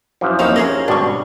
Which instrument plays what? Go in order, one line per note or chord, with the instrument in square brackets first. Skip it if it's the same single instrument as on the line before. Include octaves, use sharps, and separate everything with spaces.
[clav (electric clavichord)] F#2 E3 F3
[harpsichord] D#2 C4 [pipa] D#4 C#5 F5
[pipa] C3 G#4 A#4 [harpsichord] C#4
[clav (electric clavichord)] G#1 B2 G3 [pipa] D4 C#6